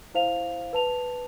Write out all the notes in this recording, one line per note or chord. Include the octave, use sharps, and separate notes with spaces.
E4 C5 F5 F7
B4 A5 F7